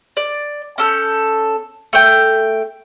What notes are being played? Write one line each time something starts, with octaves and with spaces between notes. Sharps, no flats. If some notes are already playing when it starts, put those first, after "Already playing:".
D5
C#4 A4 G6
A3 G5